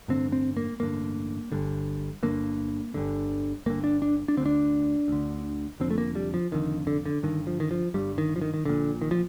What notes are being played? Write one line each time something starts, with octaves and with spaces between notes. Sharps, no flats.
A1 G2 D3 C4
C4
A#3
A1 G2 D3 A#3
G1 G2 D3
G1 G2 D3 A#3
G1 G2 D3
G1 G2 D3 A#3
D4
D4
D4
D2 D3 C4
D4
D2 D3
F1 F2 D3 C4
A3
A#3
G3
F3
F1 F2 D3 D#3
D3
D3
G1 G2 D3 D#3
F3
D#3
F3
G1 G2 D3 G3
D#3
F3
D#3
D#3
A#1 A#2 D3
D#3
F3